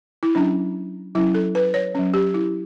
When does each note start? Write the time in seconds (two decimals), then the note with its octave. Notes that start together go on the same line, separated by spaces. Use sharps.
0.23 E4
0.35 F#3 C#4 D4
1.15 F#3 C#4 E4
1.34 A4
1.55 B4
1.74 C#5
1.95 F#3 C#4
2.14 G4
2.34 E4